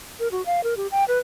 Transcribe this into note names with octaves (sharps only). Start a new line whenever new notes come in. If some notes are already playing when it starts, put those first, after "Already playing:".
A#4
F#4
F5
A#4
G4
G5
B4